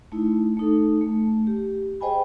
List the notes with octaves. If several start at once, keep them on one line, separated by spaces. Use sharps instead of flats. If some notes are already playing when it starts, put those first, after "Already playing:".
A3 D#4 E4
A3 D#4 A4
A3
G4
G#4 C5 D#5 G5 G#5 B5